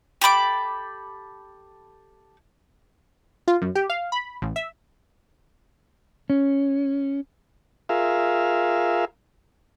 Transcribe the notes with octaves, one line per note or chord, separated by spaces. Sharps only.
G4 A4 B5 D6
F4
F#2
G4
F5
B5
A1
E5
C#4
F4 G#4 A#4 E5 F5